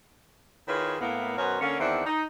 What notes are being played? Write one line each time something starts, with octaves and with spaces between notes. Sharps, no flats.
D#3 E4 F4 G#4 B4 C#5
A2 A#3 B3
F#2 B2 B3 A#4 C5 C#5
D3 A#3 C#4
E2 D#3 C4 D4 E5 F#5
D#4